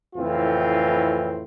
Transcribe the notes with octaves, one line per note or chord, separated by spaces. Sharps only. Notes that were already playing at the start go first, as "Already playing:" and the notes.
F2 A2 C#3 E3 C4 F4